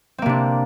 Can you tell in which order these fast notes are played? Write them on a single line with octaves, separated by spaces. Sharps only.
C4 A#3 C3 D4